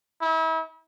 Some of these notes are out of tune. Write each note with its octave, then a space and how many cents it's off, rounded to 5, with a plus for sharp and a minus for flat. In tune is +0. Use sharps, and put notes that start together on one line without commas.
E4 -35